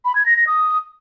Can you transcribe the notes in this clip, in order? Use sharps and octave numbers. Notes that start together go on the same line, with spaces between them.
B5
G#6
A#6
A#6
D#6